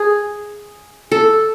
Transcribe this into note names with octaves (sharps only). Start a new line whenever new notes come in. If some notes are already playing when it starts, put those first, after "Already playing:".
Already playing: G#4
A4